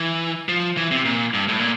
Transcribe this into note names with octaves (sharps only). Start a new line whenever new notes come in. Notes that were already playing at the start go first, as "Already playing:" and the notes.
Already playing: E3
F3
E3
C3
A#2
G2
A2
A#2